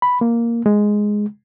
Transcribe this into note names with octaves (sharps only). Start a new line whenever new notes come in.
B5
A#3
G#3